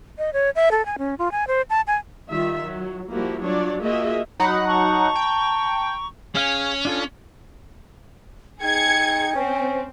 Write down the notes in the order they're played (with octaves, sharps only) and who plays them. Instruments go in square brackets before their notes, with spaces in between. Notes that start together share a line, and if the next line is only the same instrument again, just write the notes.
[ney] D#5
C#5
E5
A4
G#5
C#4
F4
G#5
C5
A5
G#5
[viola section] D#3 G3 F4 E5
F#3
F3 G3 A#3 E4 F#4 G4
F#3 D4 F4 C#5 D5
A#3 F4 F#4 G#4 D#5 E5
[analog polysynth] F#3 D#4 F#5 [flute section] B5
[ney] A5 [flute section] A#5 C#6
[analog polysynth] G5
[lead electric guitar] C#4 [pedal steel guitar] G#4 F5 G#5
[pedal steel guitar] D4 F4 A4
[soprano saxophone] D#4 [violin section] G#4 G#6 C#7 [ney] G5
[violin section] C4 [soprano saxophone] C#4